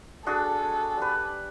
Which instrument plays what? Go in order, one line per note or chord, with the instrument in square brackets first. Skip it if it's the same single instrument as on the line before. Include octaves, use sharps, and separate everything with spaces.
[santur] D4 F#4 G#4 [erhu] A4
[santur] G3 B4